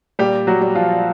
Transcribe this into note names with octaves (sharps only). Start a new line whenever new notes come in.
A#2 G3 G4
F#3 F#4
G3
F3 F4